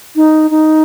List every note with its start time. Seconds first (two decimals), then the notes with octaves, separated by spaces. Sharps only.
0.16 D#4
0.51 D#4